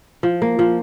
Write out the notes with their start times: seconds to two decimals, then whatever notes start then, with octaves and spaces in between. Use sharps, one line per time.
0.23 F3
0.42 A#3
0.59 F3